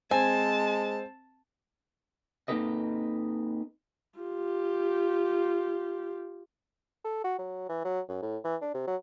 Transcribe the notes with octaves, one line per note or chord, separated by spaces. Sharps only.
G#3 C4 G#5 A5
A#3 C4 D#4 A4 B4 D#5
F4 G4
A4
F#4
F#3
E3
F#3
F#2
A2
E3
D4
C3
F#3